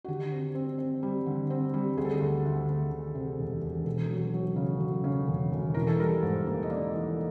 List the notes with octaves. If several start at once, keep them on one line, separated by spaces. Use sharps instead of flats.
F#4
D3 G4
C4
C4
C4
G3
D3
C4
G3
D2 G#4
A4
G#4
D2
D2
D2
D2
C3
E1
E1
E1 A4
F#3
F#3
C#3
F#3
C#3
E1
E1
E3 A#4
A4
G3 A#4
G#2
A#3
D#5
A#3 D5
E3